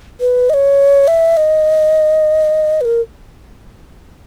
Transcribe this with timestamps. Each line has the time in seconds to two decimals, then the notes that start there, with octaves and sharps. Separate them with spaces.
0.21 B4
0.50 D#5
0.54 C#5
1.08 E5
1.37 D#5
2.81 B4
2.85 A#4